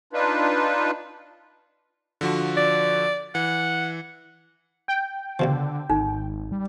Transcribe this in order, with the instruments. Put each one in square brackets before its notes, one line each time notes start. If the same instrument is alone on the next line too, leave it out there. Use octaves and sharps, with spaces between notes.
[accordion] D4 D#4 F4 B4
[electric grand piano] D3 F3 F#4
[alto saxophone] D5
[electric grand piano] E3 [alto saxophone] F#5
[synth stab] G5
[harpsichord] C#2 B2 F3 [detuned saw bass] D3
[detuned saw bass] G#1 [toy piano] D#4
[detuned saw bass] G3